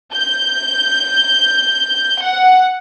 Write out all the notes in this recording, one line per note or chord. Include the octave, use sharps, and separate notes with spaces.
G6
F#5